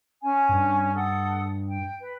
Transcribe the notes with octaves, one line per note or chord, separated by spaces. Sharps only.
C#4 G#5
G2
A4 F#5 D#6
G5
B4